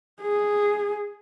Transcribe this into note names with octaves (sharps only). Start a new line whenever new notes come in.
G#4